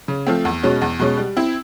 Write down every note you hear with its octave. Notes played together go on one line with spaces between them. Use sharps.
C#3
F3 A3 C4
E2
B2 G#3 C#4
E2
B2 G#3 C#4
G3
C4 E4